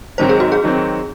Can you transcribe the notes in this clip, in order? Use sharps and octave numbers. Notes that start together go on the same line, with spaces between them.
G#2 D#3 F#3 C4 C5
G#4
F#4
G#4
D#3 F#3 C4